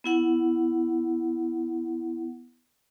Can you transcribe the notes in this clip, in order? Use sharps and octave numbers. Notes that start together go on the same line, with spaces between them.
B3 E4 F#5